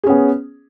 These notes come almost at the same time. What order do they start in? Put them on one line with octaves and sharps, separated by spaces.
G#4 C#4 B3